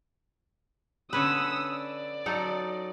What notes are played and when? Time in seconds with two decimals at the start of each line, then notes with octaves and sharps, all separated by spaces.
1.13 D3 C#4 B4 D#6 E6
1.74 D5
2.26 F#3 D#4 A4